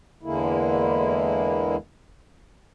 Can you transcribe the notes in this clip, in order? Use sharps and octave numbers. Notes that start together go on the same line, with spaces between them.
E2 D3 G#3 A#3 E4